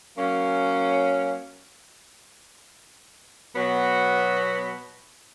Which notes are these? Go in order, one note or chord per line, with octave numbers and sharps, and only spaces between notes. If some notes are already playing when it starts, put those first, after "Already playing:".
F#3 A#3 C#4
B2 F#3 B3 F#4